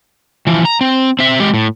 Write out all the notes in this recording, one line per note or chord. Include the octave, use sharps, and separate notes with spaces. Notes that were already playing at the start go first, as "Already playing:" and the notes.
E3 F3
A#5
C4
C4 E5
G#3 G4
A2